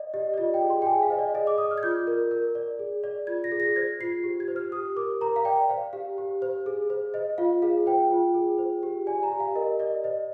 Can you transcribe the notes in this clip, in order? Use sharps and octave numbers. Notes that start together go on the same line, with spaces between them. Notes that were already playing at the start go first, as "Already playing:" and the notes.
Already playing: D5 D#5
G4 D#5
D5
F4 D#5
G5
G#4
C6
G5
G#4 G#5
F5
C5 D#5
D5
G#4 D#5
D6
D5 D#6
F6
G#6
F4 G6
A#4
A#4
D5
G#4
D5
F4 G#6
A#6
G#4
A#6
C5 G#6
F4 C7
G4
G#6
C5
F6
G4 D#6
A#4 D6
A#4 A#5
F5
D5 G5
C5 F5
G4 F5
G4
C5
G#4
C5
C5 D#5
F4 F5
G#4 F5
C5 G5
F4
G#4
C5
G4
D5 G#5
A#5
G4
F5
A#4 D#5
D5 D#5
C5 D#5